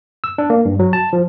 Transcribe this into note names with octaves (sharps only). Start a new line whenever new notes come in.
E6
D4
A#3
G2
F#3
A5
F3